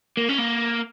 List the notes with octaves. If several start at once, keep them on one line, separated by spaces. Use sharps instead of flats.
A#3
C#4
A#3